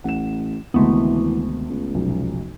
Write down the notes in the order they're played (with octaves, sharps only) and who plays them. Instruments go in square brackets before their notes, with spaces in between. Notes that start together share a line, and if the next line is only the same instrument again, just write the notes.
[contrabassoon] A1 [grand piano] F#5 E7
[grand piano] D2 C3 D#3 [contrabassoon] E3 [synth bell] G#3 A3 B3
[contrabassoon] C#2
[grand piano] F1 B1